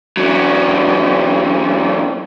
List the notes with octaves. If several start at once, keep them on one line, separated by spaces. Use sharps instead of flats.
E2 F#3